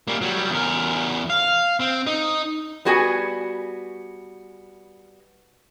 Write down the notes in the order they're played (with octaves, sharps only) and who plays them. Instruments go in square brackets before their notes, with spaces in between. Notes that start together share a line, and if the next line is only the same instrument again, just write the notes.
[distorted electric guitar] G3 A#3
F#3 G3
E2 A#4
F5
C4
D#4
[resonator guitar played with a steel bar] G3 B3 F#4 G#4 G#5